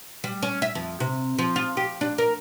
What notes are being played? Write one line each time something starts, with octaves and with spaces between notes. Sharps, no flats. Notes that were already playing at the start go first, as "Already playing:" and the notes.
G3
C#4
E5
F2
C3
F3
F4
G4
D4
A#4